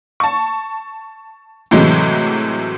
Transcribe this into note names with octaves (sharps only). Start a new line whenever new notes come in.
A5 C#6
A2 C3 E3 F#3 G#3